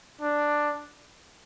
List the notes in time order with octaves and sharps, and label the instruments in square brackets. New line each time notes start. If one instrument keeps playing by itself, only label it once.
[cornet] D4